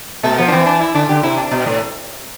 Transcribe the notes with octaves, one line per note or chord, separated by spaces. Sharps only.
B2 A3
F3 B3
D4
E3 C4
D4
E4
D3 D4
D3 G4
C3 E4
D4
B2
A2